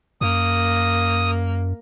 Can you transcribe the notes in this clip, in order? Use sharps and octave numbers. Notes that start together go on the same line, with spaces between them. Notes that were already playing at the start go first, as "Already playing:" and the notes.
F#2 A#3 D#6